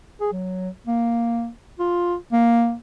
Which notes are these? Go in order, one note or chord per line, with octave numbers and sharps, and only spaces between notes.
G#4
F#3
A#3
F4
A#3